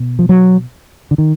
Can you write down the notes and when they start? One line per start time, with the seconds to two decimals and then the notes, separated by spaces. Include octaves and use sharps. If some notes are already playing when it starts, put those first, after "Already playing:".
Already playing: B2
0.19 F3
0.29 F#3
1.11 D3
1.18 D#3